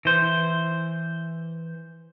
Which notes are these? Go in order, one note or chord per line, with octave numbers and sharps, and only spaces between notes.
E3 C5